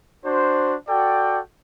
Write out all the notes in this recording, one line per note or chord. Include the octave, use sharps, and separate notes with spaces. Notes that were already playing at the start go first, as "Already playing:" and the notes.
D4 F#4 C5
F#4 A4 D5 G5